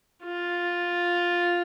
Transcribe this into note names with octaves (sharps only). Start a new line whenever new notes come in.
F4